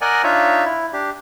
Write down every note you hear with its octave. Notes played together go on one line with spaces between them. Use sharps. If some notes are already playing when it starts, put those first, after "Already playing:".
A#4 D5 D#5 F#5 G#5
D4 D#4 F4 C#5 E5
E4
D4 G4